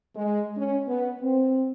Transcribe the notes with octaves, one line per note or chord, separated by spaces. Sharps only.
G#3
C#4
B3
C4